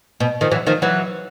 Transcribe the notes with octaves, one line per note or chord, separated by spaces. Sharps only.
B2
D#3 F3
E3 F#3
D#3 F3
E3 F#3